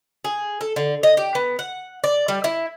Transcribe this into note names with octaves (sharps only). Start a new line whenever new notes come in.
G#4
A4
D3
D#5
G4
B3
F#5
D5
G3
E4